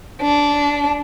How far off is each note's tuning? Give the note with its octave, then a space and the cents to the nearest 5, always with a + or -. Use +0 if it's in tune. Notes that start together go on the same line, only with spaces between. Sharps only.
D4 -15